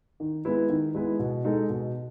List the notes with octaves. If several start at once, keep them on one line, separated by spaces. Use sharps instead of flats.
D#3
G#3 B3 E4 B4
D#3
G#3 B3 E4 B4
B2
G#3 D#4 A4
B2